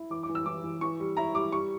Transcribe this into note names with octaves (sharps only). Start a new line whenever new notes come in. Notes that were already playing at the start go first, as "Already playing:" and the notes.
Already playing: E4
E3 D6
D6
E3
E6
E3 D6
E3
E3 C#6
G3
E4 A#5
G3 D6
G3 C#6